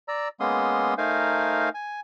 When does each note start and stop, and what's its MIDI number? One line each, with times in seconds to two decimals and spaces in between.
0.08 0.28 74
0.08 0.28 82
0.08 0.28 88
0.40 0.94 56
0.40 0.94 58
0.40 0.94 59
0.40 0.94 61
0.40 0.94 84
0.40 0.94 87
0.98 1.69 57
0.98 1.69 63
0.98 1.69 70
0.98 1.69 72
0.98 1.69 77
0.98 1.69 80
1.74 2.00 80